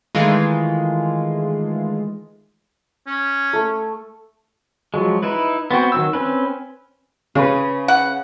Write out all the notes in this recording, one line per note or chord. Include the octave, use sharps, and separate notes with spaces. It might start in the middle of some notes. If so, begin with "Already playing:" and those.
D#3 E3 G#3 A3 F4
C#4
A3
F3 F#3 G#3
D#4 E4 B4
B3 C4 F#4 G5
D#3 F#3 E6
C4 C#4 B4
C#3 C#4 B4
F#5